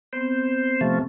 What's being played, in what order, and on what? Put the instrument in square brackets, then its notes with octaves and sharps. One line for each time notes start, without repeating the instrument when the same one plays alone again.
[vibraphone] B3 C4 [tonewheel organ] C5
[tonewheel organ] C3 F3 A3